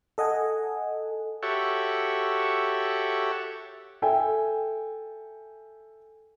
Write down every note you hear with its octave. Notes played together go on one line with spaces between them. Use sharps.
A4 D#5 F#5 G#5
F#4 G4 A4 C#5 E5
A4 E5 G5 G#5